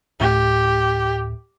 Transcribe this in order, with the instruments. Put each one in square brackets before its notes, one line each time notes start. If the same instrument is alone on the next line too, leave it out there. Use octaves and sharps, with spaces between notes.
[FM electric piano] D2 A2 [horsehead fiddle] G4